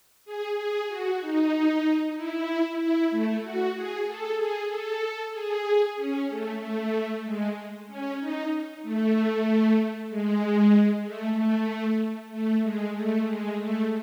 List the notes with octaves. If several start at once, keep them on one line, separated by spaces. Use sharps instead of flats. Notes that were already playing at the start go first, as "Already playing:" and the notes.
G#4
G#4
F#4
D#4
E4
E4
A3
F#4
G#4
A4
G#4
A4
G#4
C#4
A3
A3
G#3
C#4
D#4
A3
G#3
A3
A3
A3
G#3
A3
G#3
A3